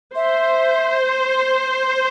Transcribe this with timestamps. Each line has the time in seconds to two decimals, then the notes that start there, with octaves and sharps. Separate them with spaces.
0.14 C5 E5